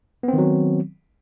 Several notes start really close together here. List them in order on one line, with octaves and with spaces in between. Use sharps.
B3 C4 D#3 F#3